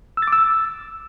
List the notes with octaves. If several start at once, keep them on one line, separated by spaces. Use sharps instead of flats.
E6
A6
D6
E6